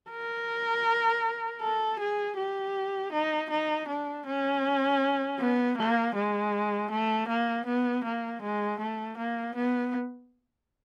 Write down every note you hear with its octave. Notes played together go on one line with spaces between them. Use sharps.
A#4
A4
G#4
G4
D#4
D#4
D4
C#4
B3
A#3
G#3
A3
A#3
B3
A#3
G#3
A3
A#3
B3